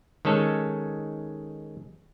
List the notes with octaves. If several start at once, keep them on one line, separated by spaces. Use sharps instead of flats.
D#3 G#3 C#4 A4